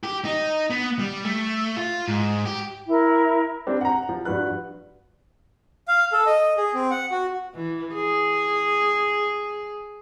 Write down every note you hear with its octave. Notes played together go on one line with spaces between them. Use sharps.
G4
D#4
B3
G3
A3
F4
G#2
G4
E4 A#4
G3 C4 D4
F#5 A#5
F3
G2 F3 F#4 B4 F#6
F5
A4
D#5
G#4
C4
F#5
F#4
E3
G#4